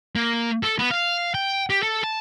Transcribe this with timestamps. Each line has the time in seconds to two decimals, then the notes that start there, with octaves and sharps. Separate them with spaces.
0.16 A#3
0.63 A4
0.79 B3
0.91 F5
1.34 G5
1.70 G4
1.83 A4
2.04 A5